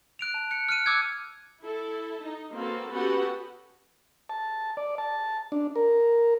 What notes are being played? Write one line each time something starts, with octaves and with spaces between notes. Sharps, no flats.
F#6 D7 F7
A5
F#6 C#7
F6 F#6 C#7 D#7
D6 E6 F#6 G#6 C#7
E4 A4
D#4
A#3 C4 F#4 A4 B4
B3 C#4 F#4 G4 A4 F#5
A5
D5
A5
D4
A#4